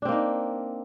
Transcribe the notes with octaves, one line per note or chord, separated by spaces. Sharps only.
A#3 C4 D4 D#4